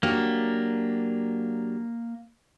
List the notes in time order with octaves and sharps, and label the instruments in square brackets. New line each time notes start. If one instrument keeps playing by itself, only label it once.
[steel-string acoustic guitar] F#3 D4 G4 [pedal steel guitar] A#3